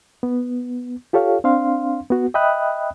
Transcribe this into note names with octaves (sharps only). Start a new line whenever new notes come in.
B3
F4 G4 A4 C#5 F5
C4 D4 F5 C6
B3 F#4
D#5 E5 G5 B5 D#6 F#6